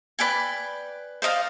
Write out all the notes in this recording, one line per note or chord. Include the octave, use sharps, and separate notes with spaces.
B4 D5 G5 G#5
C5 D5 D#5 F5